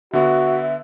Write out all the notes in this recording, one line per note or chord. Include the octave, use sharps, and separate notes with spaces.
D3 B3 F#4 E5